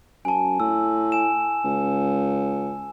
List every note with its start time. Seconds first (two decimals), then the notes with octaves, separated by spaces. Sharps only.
0.25 F#2 G#5 A5
0.60 A2 E6
1.12 G#5 E7
1.64 C#2